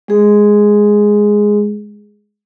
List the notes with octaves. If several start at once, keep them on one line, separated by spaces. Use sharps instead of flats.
G#3 G#4